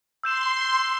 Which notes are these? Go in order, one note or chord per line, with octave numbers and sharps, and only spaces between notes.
C6 E6 G6 E7